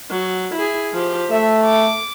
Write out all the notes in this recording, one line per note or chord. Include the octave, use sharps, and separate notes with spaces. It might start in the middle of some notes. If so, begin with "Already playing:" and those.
F#3
E4 G#4
F3 G4
A3 E5
D6